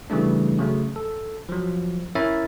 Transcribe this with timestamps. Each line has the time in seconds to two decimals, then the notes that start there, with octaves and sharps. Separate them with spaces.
0.10 C#3 E3 G3 A3 D4
0.59 C#3 F#3 A3
0.96 A4
1.49 F3 F#3
2.15 C#4 E4 A#4 C#5 E5 A6